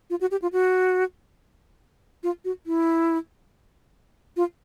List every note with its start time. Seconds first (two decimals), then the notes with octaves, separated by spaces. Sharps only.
0.10 F4
0.21 F#4
0.31 G4
0.42 F4
0.53 F#4
2.23 F4
2.45 F#4
2.66 E4
4.37 F4